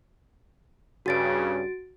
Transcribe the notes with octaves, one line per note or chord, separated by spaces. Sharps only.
G2 C#3 F#4 A6 D7